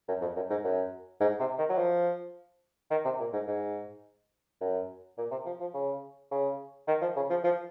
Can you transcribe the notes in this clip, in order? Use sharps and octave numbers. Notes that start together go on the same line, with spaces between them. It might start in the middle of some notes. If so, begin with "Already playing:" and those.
F#2
F2
F#2
G#2
F#2
G#2
C3
D#3
F#3
F3
D#3
C3
A#2
G#2
G#2
F#2
A#2
C3
F3
F3
C#3
C#3
D#3
F3
C#3
F3
F3